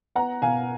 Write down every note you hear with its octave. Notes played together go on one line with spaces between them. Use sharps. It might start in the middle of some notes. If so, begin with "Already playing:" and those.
B3 F#5 A#5
B2 F5 G#5